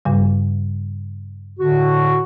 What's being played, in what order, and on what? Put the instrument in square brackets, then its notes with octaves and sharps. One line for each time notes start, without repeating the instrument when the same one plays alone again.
[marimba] G2 C#3 G3
[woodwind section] A2 D3 F#4